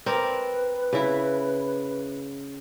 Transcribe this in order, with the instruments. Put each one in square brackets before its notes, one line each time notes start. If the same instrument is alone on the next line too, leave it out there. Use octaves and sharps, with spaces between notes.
[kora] C4 A#4 D5 [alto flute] B4
[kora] C#3 E4